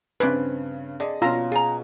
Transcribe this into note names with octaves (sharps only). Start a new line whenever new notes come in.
G2 C#3 C4 G#4 B4 C5 D5
D3 G#4 D5 D#5
B2 C#4 F4 A#5
F4 G#4 A#5